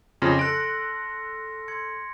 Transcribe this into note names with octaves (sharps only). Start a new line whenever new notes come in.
F2 C#3 F3 C6 F6 A#6
A4 F#6 A#6 C#7 D7
C6 G#6 C#7